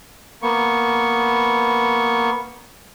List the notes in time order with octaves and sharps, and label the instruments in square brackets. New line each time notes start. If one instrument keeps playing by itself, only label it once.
[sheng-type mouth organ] A#3 B3 C#6